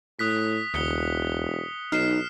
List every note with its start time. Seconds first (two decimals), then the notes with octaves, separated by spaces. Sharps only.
0.19 A2 D#6 F#6 B6
0.74 E1 D2 D#6 C#7 G7
1.92 B1 D#4 F6 C7 E7